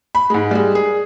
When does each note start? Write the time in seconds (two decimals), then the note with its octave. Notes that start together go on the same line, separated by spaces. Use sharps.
0.15 B5
0.30 G#2 G#3
0.51 G3 G#3
0.75 G#4